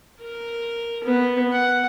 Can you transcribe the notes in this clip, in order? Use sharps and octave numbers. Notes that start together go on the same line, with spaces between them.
A#4
B3
F#5